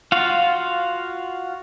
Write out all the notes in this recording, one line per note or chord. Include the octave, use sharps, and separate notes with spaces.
F4 F#4 F5